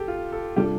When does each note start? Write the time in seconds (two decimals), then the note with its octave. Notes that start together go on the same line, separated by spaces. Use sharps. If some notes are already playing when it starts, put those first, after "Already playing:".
Already playing: G4 A4
0.08 F4
0.32 A4
0.56 C3 G3 D4 F4 G4 A4